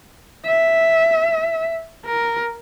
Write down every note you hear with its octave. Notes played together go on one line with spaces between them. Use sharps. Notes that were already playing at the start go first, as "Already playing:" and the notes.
E5
A#4